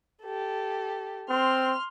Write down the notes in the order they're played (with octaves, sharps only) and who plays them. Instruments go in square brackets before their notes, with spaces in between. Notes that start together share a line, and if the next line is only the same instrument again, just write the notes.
[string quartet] G4 A4
[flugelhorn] C4 [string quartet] C6 F6